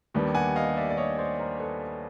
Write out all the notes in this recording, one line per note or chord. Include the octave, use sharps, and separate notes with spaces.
D#2 D#3 G3 B3 D4
F#5 G#5
D#5 F5
D5 E5
D5
C#5 D#5
C5 D5
A#4 C5
A4 B4